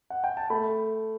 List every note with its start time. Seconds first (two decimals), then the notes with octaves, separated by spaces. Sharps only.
0.10 F#5
0.24 G5
0.37 A5
0.50 A3 B5